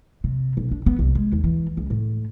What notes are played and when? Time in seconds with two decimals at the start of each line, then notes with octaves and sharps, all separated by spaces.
0.24 C3
0.57 B1
0.71 D4
0.86 B3
0.99 C2
1.15 G#3
1.33 D#2
1.44 E3
1.77 C#2
1.90 A2